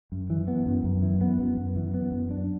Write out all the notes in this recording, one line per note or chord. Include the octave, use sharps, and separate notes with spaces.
F#2
E3
B3
F#2
F#2
E3
B3
F#2
F#2
E3
B3
F#2
D4